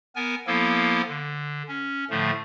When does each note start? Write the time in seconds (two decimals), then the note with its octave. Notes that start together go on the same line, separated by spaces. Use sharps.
0.16 B3 A#4 G#5
0.47 F3 A#3 B3 E4 A4
1.08 D3
1.68 C#4
2.10 A2 D3 F3 A3